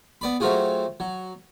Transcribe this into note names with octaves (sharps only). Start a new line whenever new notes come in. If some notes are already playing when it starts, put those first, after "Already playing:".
B3 D5 B5
F#3 A3 C4 F4 F#4 G#4
F#3